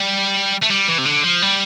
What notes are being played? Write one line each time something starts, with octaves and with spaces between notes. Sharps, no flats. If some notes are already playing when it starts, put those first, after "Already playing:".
Already playing: G3
A3
G3
E3
C3
D3
F3
G3